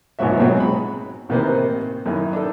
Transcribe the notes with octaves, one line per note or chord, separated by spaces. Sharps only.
G#1 C#2 A#2 F#3 F#4 E5
G#2 B2 F#3 C4 F#4 G#4
B5
A1 C3 D#3 A#3 B4 C5
F#2 D#3 E4
D4 D#4 A4